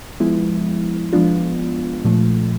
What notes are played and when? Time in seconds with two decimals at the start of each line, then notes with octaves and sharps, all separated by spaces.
0.20 F3 G#3 B3 E4
1.13 F3 G#3 B3 D4 F4
2.05 A#2 F3 A3